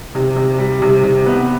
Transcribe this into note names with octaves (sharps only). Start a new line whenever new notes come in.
C3
C3
G3
C3
C3
B3